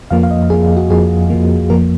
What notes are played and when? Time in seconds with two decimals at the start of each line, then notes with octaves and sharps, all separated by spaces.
0.11 F2 F3 A#3 F5
0.23 F5
0.31 D#5
0.50 F2 F3 A#3 G#4
0.77 F#4
0.90 F2 F3 A#3 G#4
1.30 F2 F3 A#3
1.70 F2 F3 A#3 A#4